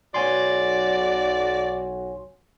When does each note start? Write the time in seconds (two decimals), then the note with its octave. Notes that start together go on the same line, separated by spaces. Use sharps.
0.14 B1 F#4 C#5 D5 G#5 C6